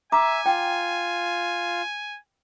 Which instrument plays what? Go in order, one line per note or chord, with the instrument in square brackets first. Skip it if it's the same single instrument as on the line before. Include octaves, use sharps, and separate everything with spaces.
[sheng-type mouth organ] E5 [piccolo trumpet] G#5 [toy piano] A#5 D6
[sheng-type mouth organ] F4 [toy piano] G5